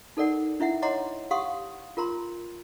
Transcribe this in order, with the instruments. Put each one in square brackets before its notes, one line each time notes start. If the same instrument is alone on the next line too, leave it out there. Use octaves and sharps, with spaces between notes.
[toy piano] D#4 A4 A#4 D5 F#5
D4 E4 E5 F#5
C#5 D#5 F#5 A#5 C6 D6
G4 F5 F#5 C6 C#6 D#6
F4 A#4 A#5 C6